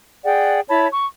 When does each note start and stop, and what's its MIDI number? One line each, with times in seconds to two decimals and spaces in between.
0.25 0.60 68
0.25 0.60 74
0.25 0.60 78
0.25 0.60 79
0.68 0.87 64
0.68 0.87 73
0.68 0.87 81
0.68 0.87 83
0.91 1.05 85